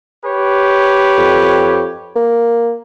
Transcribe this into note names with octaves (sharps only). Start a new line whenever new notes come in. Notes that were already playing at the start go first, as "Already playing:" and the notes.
G4 B4 C#5
F2
A#3